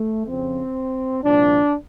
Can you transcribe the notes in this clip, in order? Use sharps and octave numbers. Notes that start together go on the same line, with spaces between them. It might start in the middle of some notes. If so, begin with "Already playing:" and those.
Already playing: A3
F2 C#3 F3 C4
C2 A#2 F3 D4